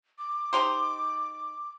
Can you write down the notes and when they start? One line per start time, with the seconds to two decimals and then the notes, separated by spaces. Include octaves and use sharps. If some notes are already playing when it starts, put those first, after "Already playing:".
0.18 D6
0.53 D#4 G4 C5